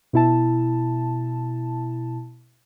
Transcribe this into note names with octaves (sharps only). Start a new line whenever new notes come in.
B2 E4 A5